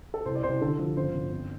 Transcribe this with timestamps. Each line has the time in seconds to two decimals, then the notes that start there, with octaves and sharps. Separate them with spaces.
0.14 A4
0.26 C2 C5
0.35 D5
0.43 C2 C5
0.61 D3 A4
0.79 F3
0.97 G1 C5
1.14 G1
1.32 C4